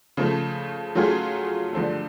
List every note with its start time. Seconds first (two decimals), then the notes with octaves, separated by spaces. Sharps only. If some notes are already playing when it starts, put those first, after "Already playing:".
0.17 C#3 F3 A3
0.95 F#3 A3 C#4 F4 G#4
1.73 G2 D3 F3 A3